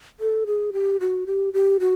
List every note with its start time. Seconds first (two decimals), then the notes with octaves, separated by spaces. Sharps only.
0.20 A4
0.47 G#4
0.73 G4
1.00 F#4
1.26 G4
1.53 G4
1.80 F#4